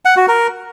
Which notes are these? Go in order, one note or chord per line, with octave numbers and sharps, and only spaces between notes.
F#5
F#4
A#4